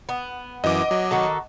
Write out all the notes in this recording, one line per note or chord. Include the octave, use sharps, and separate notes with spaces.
B3
F#2 E3 D#5 D6
F#3
D#3 F#4 A4